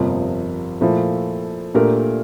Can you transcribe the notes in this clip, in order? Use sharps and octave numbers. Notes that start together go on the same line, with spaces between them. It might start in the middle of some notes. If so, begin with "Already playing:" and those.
Already playing: G1 F2 C3 F3 A#3
A#2 F3 A3 E4
A#2 A3 D4 G4 A#4